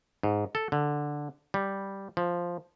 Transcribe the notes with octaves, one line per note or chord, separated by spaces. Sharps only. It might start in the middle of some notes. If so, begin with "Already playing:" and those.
G#2
A4
D3
G3
F3